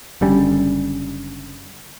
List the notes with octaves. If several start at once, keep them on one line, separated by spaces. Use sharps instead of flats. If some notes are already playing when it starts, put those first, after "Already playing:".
F#1 D3 G3 C#4